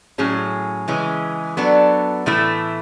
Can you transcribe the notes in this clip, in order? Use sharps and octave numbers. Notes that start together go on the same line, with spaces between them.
A2 F#3 C#4 G#4
C#3 E3 G#3 C#4
F#3 B3 D4 A4
A2 E3 A3 E4